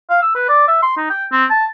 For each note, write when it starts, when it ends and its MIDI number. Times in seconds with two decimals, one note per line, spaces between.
0.10 0.18 77
0.22 0.32 88
0.35 0.46 71
0.49 0.67 74
0.68 0.81 76
0.82 0.92 84
0.97 1.05 63
1.10 1.25 79
1.32 1.45 60
1.50 1.65 81